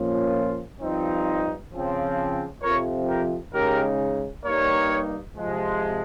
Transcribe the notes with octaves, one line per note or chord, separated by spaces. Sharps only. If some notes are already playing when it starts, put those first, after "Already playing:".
Already playing: A#2 F3 A#3 C#4 F4
G2 F3 C4 D#4
C#3 F3 C4
F2 C3 F3 A#4 C#5
G4 A#4
C#3 G#3 D#4 G4 A#4
G2 G3 A#3 D#4 A#4 C#5
C3 F3 G#3